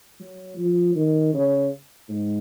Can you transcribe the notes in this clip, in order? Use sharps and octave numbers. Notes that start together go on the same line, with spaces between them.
F#3
F3
D#3
C#3
G#2